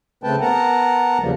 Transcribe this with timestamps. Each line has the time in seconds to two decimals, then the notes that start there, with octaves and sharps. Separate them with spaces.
0.24 C#3 A3 C4 B4 G5 A5
0.41 B3 A#4 F#5 A5 A#5
1.22 E2 C#3 F3 G3 A#3